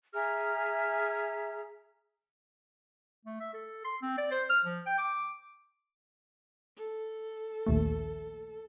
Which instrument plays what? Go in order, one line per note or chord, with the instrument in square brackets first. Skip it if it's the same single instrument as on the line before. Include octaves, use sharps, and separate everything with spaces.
[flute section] G#4 E5 A#5 F6
[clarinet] A3
E5
A4
C6
C4
D5
C5
F6
F3
G5
D6
[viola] A4
[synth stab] A#1 D#2 A3